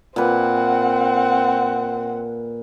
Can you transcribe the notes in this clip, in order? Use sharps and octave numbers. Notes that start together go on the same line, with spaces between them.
A#2 C4 B4 F#5